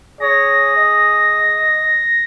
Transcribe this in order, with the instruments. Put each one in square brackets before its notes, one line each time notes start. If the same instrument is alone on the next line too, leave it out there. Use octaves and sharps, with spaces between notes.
[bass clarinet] G#4 [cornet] C#5 [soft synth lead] A#6
[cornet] D#5